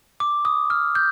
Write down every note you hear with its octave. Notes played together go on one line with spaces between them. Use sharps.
D6
D#6
F6
G6